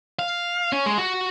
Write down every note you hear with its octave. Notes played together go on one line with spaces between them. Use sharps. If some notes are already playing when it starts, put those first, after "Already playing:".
F5
C#4
G#3
F#4